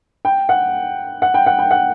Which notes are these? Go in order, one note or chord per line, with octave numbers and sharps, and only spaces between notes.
G5
F#5
F#5
G5
F#5
G5
F#5